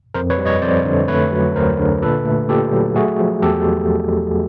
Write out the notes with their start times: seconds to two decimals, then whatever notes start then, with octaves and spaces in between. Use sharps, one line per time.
0.14 F2 A#4 C5
0.30 B4 C#5
0.38 G3
0.45 C#5 D#5
0.62 F2 C5 D5
0.85 D3
1.08 A3 B4 C#5
1.32 F#3
1.55 D2 A#4 C5
1.79 D3
2.02 A#2 A4 B4
2.25 A3
2.49 A#2 G4 A4
2.72 F#3
2.96 A3 F#4 G#4
3.19 F3
3.42 E2 G4 A4